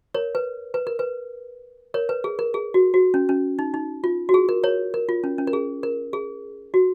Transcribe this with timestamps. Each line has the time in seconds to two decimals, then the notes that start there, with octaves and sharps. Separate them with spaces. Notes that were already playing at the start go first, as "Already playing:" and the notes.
0.14 A#4 C#5
0.35 B4
0.74 B4
0.87 A#4
0.99 B4
1.94 A#4 C#5
2.09 B4
2.24 G#4
2.39 A#4
2.54 G#4
2.74 F#4
2.94 F#4
3.14 C#4
3.29 C#4
3.59 D#4
3.74 D#4
4.04 F4
4.29 F#4
4.34 G#4
4.49 A#4
4.63 A#4 C#5
4.94 A#4
5.09 F4
5.24 C#4
5.38 C#4
5.47 A#4
5.53 G#4
5.83 A#4
6.13 G#4
6.74 F#4